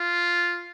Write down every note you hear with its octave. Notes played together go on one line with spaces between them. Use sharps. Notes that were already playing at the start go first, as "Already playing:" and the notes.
Already playing: F4